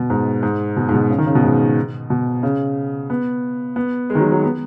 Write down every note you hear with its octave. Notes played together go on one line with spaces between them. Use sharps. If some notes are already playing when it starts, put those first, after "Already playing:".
Already playing: B2
G#2
G#2
B2
G#2
B2
C#3
D#3
C#3
B2
G#2
B2
C#3
B3
B3
G#3
D#3
F#3
F#3
B3